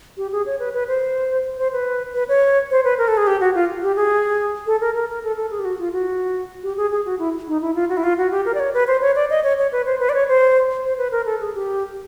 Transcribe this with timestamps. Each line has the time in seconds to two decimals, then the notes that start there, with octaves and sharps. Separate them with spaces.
0.17 G4
0.32 G#4
0.46 C#5
0.59 B4
0.74 B4
0.88 C5
1.58 C5
1.73 B4
2.14 B4
2.29 C#5
2.71 C5
2.84 B4
2.98 A#4
3.08 A4
3.17 G#4
3.27 G4
3.41 F#4
3.55 F4
3.82 G4
3.96 G#4
4.67 A4
4.81 A#4
4.95 A#4
5.09 A#4
5.24 A4
5.37 A4
5.51 G#4
5.59 G4
5.65 F#4
5.79 F4
5.93 F#4
6.63 G4
6.77 G#4
6.91 G#4
7.05 F#4
7.19 E4
7.48 D#4
7.61 E4
7.75 F4
7.89 F#4
7.97 E4
8.04 F4
8.18 F#4
8.31 G4
8.46 A#4
8.54 D5
8.60 C#5
8.74 B4
8.87 C5
9.01 C#5
9.16 D5
9.30 D#5
9.43 C#5
9.58 C#5
9.72 B4
9.86 C5
10.00 B4
10.09 D5
10.14 C#5
10.28 C5
10.84 C5
10.98 B4
11.12 A#4
11.26 A4
11.41 G#4
11.54 G4